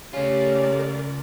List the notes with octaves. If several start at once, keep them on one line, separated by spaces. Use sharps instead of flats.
C#3 A3 C#4 F4 G4 A#4 D5